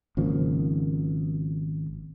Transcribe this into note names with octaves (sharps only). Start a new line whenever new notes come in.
G#1 C#3 F3 A#3